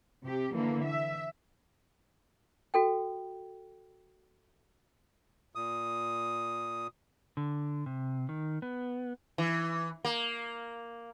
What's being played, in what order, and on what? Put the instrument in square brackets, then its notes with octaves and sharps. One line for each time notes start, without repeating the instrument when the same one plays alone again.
[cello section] C3 G4
D3 E3 A#3
E5
[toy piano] F#4 A4 G5
[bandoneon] A#2 D#6
[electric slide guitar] D3
C3
D#3
B3
[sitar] E3
A#3